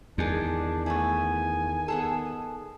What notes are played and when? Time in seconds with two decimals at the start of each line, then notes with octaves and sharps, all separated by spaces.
0.18 E2 D#3 G#3 D4 G#4
0.86 A3 B3 E4 G#5
1.88 B3 G#4 A4